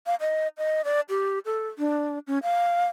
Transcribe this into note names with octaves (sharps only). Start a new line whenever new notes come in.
F5
D#5
D#5
D5
G4
A4
D4
C#4
F5